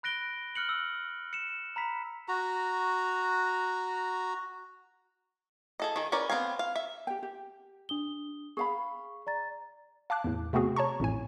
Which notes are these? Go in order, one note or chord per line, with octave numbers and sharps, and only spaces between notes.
B5 F#6 A#6 D7 G7
F6 F#6 C#7 F#7
E6
C#7 E7
A#5 B5 B6
F#4 A#5
G#4 A4 D#5
D#3 G#4
C#4 A#4 B4 D5
B3 C4 F5 G#5
F5
E5
G4 G5
G4
D4 D#6 G7
G#4 F5 B5 C#6
D5 A#5 A6
F5 A5 D6 F#6
E2 A2
C3 A3 B3 C4 F#4 G#4
C#5 A5 A#5 C#6
A1 F2 A2 G#5